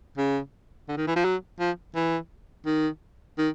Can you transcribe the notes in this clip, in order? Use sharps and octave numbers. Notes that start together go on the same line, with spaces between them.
C#3
D3
D#3
E3
F3
F#3
F3
E3
D#3
D#3